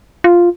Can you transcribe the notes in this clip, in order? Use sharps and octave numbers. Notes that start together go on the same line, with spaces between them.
F4